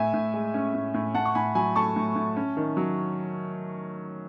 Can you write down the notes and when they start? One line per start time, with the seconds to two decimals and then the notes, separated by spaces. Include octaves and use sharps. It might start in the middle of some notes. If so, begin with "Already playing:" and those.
Already playing: A2 E5 G#5
0.14 A2
0.34 G#3
0.54 C#4
0.74 A2
0.94 A2
1.15 A2 F#5 A5
1.25 C#6
1.35 A2 G#5 B5
1.55 F#3 G#5 B5
1.76 A3 A5 C#6
1.96 A2
2.16 A2
2.36 C#4
2.57 D#3
2.77 F#3